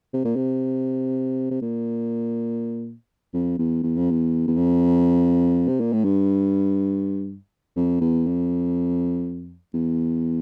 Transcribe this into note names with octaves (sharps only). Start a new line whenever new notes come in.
C3
A#2
C3
C3
A#2
F2
E2
E2
F2
E2
E2
F2
C3
A#2
A2
G2
F2
E2
F2
E2